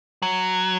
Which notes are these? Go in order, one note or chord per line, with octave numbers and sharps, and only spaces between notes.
F#3